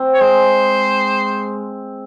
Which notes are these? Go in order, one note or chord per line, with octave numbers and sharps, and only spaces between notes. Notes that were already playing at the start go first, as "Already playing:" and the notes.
Already playing: C4
C#5
G#3 C5